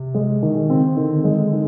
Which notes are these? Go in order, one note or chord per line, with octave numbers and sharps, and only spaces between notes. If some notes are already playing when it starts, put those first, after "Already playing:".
Already playing: C3
G#3
B2 D#3
C#3 C4
D3 D#3
G#3
D#3